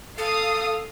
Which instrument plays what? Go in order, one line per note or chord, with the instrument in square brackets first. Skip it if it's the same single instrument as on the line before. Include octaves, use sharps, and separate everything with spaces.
[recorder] A4 [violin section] F5 D#6